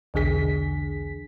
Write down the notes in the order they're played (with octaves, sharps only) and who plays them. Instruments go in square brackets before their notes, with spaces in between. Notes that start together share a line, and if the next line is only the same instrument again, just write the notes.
[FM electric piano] B1 E2 D3 G#4 B6